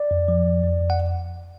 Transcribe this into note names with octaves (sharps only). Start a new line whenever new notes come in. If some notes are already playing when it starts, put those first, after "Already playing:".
Already playing: D5
F2
F3
F2
F2
F2
F#5